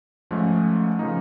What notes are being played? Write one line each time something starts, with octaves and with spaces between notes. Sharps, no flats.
G#2 F3 A3 C#4
C#3 F3 A#3 D#4